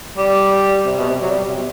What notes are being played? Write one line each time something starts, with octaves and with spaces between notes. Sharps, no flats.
G3
C3
B2
C3
F#3
G3
C3
B2